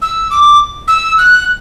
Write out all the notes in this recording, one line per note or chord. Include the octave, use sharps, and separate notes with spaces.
E6
D6
E6
F#6